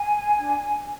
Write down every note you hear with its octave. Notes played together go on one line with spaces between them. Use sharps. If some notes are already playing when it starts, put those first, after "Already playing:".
Already playing: G#5
D4